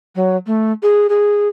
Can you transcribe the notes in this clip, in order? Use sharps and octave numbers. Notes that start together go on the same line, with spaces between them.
F#3
A3
G#4
G#4